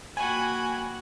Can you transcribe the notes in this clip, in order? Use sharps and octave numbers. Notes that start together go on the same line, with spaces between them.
A#3 F#4 G5 G#5 B5